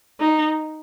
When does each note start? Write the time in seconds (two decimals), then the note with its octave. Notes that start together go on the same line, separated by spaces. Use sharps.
0.20 D#4